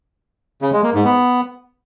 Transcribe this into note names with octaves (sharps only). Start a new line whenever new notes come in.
C#3
G#3
A#3
G#2
B3